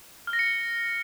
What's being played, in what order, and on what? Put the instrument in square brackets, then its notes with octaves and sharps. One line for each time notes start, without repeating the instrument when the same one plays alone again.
[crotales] F6
A#6
C#7